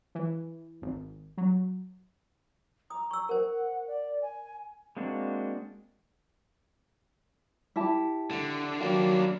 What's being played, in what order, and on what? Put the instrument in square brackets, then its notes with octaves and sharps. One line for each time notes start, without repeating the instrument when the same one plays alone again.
[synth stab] E3
G#1
F#3
[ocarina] A#5 [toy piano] D#6
[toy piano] C#6 E6
[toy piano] A#4 C5 [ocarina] F#5
[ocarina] D5
G#5
[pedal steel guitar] G#3 A#3 C4 D4 F#4
[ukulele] E4 G4 A5
[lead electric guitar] D3
[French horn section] D#3 F#3 [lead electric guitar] A#3 D4 [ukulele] G4